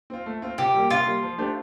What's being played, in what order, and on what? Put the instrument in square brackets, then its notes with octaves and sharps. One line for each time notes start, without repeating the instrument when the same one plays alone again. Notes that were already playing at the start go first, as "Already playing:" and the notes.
[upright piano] C4 F4
A3
C4 F4
[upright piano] C3 [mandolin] G4
[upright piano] G3 A#3
[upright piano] C3 [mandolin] F4
[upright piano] G3 A#3
F3
A3 D4 G4 C5